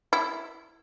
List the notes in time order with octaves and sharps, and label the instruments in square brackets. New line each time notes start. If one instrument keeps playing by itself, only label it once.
[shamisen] E4